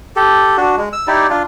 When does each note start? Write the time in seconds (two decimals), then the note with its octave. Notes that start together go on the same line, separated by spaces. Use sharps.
0.16 G4 A4
0.57 D4 F#4
0.77 G#3
0.93 E6
1.07 D#4 E4 G4 D5
1.30 D4 F4